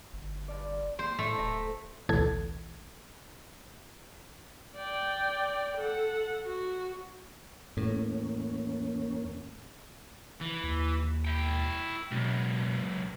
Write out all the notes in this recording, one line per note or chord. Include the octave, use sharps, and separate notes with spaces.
G1
G2 F3 D5
A#3 C5
A2 A3 D4 E5
D1 A4 E5 A#5
A1 D2 B2 E3 A4 G#6
D5 G5
A4 F#5
F#4
E2 A2 A#3 C#4
E3
D#2
E4 G5
C#2 F#2 B2